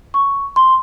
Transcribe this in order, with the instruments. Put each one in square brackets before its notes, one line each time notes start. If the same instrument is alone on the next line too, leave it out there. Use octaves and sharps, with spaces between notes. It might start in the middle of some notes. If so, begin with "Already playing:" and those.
[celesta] C#6
C6